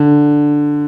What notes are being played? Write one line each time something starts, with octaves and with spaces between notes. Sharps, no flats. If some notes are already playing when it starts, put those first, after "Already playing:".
Already playing: D3